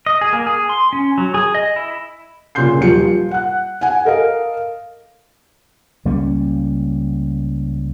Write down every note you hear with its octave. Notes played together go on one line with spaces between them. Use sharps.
D#5
G#4
A#3
G#4
C6
C#4
F#3
G#4
D#5
E4
A#2 C#3 C6 G6 C7
D#1 F3 F#3 C#7
F4
F#5 F#6
F#5 G#5
A4 A#4 D#5 F5
C#2 G3 A#3 C#4